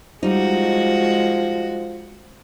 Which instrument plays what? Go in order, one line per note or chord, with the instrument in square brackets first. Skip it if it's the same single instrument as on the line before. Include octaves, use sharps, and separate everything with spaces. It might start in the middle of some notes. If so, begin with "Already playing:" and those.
[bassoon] F3 [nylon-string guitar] G3 D#4 [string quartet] G#3 F#4